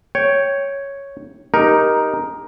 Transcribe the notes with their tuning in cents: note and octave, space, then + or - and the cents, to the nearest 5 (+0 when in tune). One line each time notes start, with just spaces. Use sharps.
C#5 +0 G5 +0
D#4 +0 G4 +0 A#4 +10